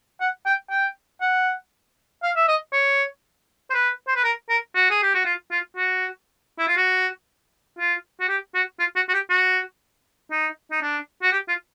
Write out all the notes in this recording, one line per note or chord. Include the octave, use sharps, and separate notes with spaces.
F#5
G5
G5
F#5
F5
E5
D#5
C#5
C5
B4
C5
B4
A#4
A#4
F#4
G#4
G4
F#4
F4
F4
F#4
E4
F4
F#4
F4
F#4
G4
F#4
F4
F#4
F#4
G4
F#4
D#4
D#4
D4
F#4
G4
F4